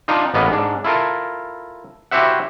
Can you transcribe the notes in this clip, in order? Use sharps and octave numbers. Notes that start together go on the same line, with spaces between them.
D4 D#4 F4 D#5
A1 A#3 B3 D#5
G#2 D4
E4 F4 A4 A#4
E4 F#4 G4 C5 E5 F#5